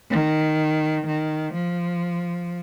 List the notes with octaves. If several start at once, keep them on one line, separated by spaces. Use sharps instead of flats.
D#3
D#3
F3